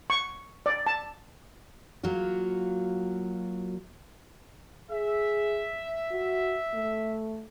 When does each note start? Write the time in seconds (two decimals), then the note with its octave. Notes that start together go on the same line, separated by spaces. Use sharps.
0.10 C#6
0.66 D5
0.87 A5
2.03 F#3 A#3 F4 F#4
4.91 G#4 E5
6.11 F#4
6.74 A3